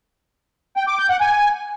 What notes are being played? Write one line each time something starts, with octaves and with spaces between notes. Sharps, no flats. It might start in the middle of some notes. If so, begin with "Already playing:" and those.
G5
D6
G6
F#5
G#5